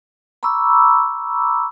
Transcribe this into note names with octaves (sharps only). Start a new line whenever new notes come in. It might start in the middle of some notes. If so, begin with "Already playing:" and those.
A#5 B5 C#6 D6 E6